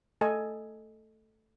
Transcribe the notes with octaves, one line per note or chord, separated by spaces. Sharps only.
A3 A4 D#5 G#5